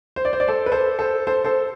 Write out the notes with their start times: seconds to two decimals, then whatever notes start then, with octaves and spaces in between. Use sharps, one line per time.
0.16 C5
0.25 D5
0.33 C5
0.40 D5
0.48 A4 C5
0.66 B4
0.72 A4 C5
0.99 A4 C5
1.27 A4 C5
1.45 A4 C5